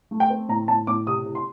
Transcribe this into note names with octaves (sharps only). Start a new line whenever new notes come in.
A3
G5
C4
A2 A#5
A2 A5
A2 D6
C3 D#6
C3
C6